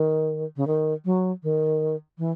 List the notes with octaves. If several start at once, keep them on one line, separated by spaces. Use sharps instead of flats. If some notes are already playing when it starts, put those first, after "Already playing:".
Already playing: D#3
C#3
D#3
F#3
D#3
E3